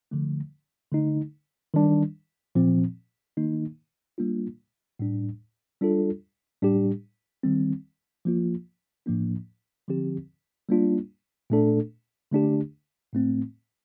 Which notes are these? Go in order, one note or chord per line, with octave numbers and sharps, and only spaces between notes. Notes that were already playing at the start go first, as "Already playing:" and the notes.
D3 F3 A3
D3 A3 D#4
D#3 G3 D4
A#2 F3 C4
D#3 A#3 D#4
G3 A#3 D4 F4
A2 G3 D4
G3 D4 F4 A4
A2 G3 D4 G4
D#3 G3 C4
F3 A#3 F4
A2 F3 A#3 D4
D3 F3 C4 G4
G3 A#3 D4 F4
A#2 A3 D4 A4
D3 A3 D4 G4
A2 A3 C4